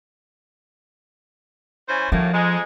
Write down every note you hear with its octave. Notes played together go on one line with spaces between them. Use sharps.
E3 C#4 C5
F#2 A2 F3 A#3
F2 G#3